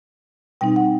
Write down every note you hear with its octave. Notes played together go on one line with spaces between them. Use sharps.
B2 G3 C4 D#4 G5
F#5